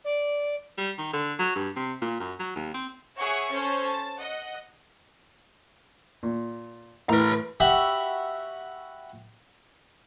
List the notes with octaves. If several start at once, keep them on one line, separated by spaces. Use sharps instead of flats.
D5
G3
D#3
D3
F#3
G2
C3
A#2
F#2
F#3
D#2
C4
G#4 C#5 E5 F#5 C#6
C#4 A4 C5 C#5
A5
D#5 F#5
A#2
A2 E3 A#4 B4 A#5
F#4 G4 E5 B5